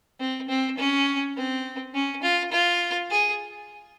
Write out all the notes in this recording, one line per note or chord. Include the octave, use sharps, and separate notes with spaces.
C4
C4
C#4
C4
C#4
F4
F4
G#4